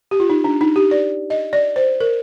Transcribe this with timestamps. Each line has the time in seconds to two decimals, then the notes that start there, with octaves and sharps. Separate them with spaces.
0.11 G4
0.20 F4
0.30 D#4
0.44 D4
0.61 D#4
0.76 G4
0.91 D5
1.30 D#5
1.53 D5
1.76 C5
2.00 A#4